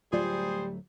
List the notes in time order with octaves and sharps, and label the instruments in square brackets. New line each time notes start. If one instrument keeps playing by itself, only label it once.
[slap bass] D1 F#3 A3 [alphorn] G3 [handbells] F4 D5 [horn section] G#4 C5